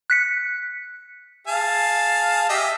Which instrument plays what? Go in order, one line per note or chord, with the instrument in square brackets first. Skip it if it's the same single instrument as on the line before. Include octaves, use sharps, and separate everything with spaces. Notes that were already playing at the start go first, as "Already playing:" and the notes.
[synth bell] F#6 B6 C#7
[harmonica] G#4 F5 A5
G4 D#5 E5